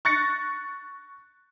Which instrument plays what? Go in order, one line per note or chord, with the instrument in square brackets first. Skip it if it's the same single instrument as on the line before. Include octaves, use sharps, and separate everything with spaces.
[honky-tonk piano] C#6 F#6 A6 A#6 C#7